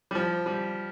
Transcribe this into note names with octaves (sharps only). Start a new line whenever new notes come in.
G3
F3
G3